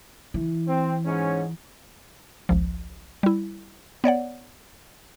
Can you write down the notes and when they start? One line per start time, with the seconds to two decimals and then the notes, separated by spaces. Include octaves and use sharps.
0.34 E3
0.67 C4
1.05 G#2 C#4
2.49 G#1 C#2 F3
3.23 G3 E4
4.04 B3 C#5 D5 F#5